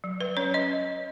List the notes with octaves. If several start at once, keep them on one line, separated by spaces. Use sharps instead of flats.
F#3
B4
C#4 C#5
D#5